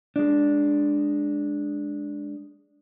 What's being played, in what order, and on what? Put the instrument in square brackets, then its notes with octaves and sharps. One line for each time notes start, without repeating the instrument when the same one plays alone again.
[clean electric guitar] G#3 D4